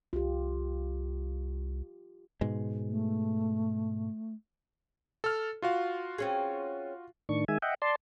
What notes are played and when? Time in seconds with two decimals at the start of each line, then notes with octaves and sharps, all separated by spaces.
0.13 C2 F4 G4
2.41 G#2 B2 G#3
2.90 A3
5.24 A4 F6
5.62 F4 F#4 F5
6.18 C4 C#4 G#4
7.29 A2 D#3 D4 C#6
7.48 D#3 G#3 E5 G#5
7.62 D#5 E5 F#5 G5
7.82 D5 A5 C6